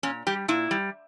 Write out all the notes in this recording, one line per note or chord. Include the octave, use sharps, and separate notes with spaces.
A#2 C#4
G3 G4
A#2 E4
G3